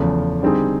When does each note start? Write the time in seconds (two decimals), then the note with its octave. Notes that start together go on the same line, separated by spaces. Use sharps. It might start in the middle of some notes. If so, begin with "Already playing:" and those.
Already playing: E2 C#3 F3 A3
0.43 D3 G3 C4 D#4 G#4